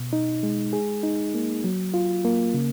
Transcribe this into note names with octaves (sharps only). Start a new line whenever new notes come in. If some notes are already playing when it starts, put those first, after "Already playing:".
Already playing: B2
D#4
G#3
G#4
D#4
A#3
F#3
F4
A#3
C#3